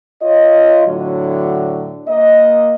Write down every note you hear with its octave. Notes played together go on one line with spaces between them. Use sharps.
F4 C#5 D#5
A2 D3 F#3
A#3 D#5